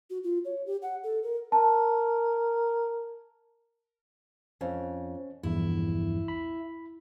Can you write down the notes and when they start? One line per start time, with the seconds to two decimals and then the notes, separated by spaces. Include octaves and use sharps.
0.10 F#4
0.24 F4
0.45 C#5
0.66 G4
0.82 F#5
1.03 A4
1.23 A#4
1.52 A#4 A5
4.61 F2 C#4
5.43 A#1 E2 G2 E4
6.28 B5